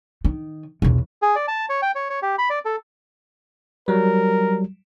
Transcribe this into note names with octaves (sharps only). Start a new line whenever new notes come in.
D#3
B1 E2
G#4
D5
A5
C#5
G5
C#5
C#5
G4
B5
D5
A4
F#3 G3 A#4